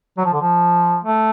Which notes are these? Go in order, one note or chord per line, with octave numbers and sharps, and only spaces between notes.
F#3
F3
D3
F3
A3